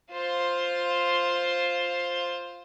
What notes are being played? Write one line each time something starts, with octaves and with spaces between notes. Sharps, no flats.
F4 C5